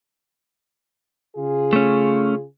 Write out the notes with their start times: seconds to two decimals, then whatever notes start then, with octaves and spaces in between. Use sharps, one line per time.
1.36 C#3 F4 G#4
1.73 A3 C#4